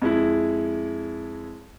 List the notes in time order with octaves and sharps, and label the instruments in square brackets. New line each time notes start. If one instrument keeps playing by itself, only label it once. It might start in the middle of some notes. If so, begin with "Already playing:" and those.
[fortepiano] F2 G#3 E4